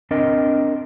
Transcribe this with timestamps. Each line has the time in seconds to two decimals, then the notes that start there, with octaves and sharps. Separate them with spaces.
0.11 C4 D4 A#4 D#5